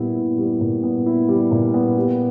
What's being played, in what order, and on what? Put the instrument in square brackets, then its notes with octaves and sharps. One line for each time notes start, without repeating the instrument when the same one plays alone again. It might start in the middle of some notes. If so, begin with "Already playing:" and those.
Already playing: [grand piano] A#2 G3 B3 E4
E4
G3
A#2
B3
E4
G3
A#2
B3
G4